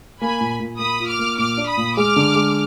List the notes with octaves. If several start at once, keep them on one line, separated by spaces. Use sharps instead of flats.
A#3 G#5 B5
A#2
A#2
A#3 B5 D#6
F4
D6 F6
A#3
A#2 D6 F6
D4
B5 D#6
A#2
G#3 D6 F6
D3
G#3